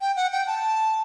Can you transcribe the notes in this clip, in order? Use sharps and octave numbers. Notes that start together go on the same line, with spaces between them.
G5
F#5
G5
A5